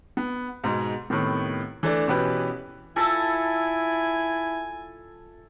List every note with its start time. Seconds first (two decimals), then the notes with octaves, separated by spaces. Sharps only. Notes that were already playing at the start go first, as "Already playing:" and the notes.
0.17 B3
0.64 G#2 B2 G#3
1.10 A2 C3 D#3 B3
1.83 E3 A3 D4
2.08 B2 E3 B3 C#4 G4 B4
2.96 E4 F4 A4 E5 G#5 A5 E6